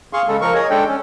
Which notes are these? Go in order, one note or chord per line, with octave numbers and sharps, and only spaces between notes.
G#4 F5 C6 C#6
C#3 G#3 A4
F3 A#4 C#6
G#4 C#5 D#5
G#3 D4 A4 G5
C#4